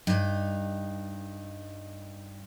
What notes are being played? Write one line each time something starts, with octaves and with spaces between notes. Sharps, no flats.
G2 D#4